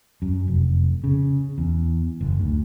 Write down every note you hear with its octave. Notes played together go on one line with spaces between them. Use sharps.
F#2
F1
C#3
E2
F#1
D2